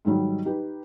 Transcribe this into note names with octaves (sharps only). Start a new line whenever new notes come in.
G#2 D#3 F#3 G3
D#4 G4 B4